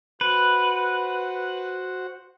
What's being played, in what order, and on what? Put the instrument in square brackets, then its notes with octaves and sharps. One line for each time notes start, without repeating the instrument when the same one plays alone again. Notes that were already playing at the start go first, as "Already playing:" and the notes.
[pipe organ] F#4 C5 F#5 [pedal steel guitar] B4